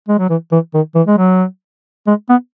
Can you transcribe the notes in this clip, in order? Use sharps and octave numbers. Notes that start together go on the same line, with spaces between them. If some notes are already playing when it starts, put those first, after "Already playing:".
G#3
F#3
E3
E3
D#3
E3
G#3
F#3
G#3
B3